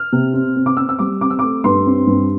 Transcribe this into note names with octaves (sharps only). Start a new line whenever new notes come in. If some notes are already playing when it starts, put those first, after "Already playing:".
Already playing: F6
C3
C4
C4
D6
C4 E6
E6
G3 D6
C4 D6
E6
A3 D6
G2 C6
C4
G2